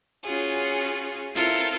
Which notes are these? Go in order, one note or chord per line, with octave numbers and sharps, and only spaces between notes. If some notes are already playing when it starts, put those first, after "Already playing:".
C#4 F4 F#4 G#4
C4 E4 F4 A4 A#4